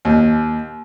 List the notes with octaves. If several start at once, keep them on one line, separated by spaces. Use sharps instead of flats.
D#2